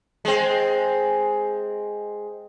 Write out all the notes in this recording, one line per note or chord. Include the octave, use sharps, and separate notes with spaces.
G#3 C4